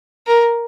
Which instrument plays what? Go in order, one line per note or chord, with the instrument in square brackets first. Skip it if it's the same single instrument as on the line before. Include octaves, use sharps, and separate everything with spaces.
[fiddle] A#4